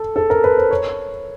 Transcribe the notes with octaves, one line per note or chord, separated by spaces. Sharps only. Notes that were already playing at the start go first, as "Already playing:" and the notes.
Already playing: A4
A4
A#4
B4
C5
C#5